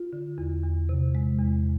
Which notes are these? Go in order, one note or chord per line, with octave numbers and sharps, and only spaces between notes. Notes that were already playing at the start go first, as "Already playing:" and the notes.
Already playing: F4
D3
E2
E2
C3
G#3
E2